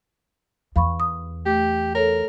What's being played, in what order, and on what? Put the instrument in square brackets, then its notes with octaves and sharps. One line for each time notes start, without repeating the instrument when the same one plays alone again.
[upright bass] E2 [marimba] F5 B5 C#6
[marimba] D#6
[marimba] A3 [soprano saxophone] G4
[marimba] A4 C#5 [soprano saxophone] A#4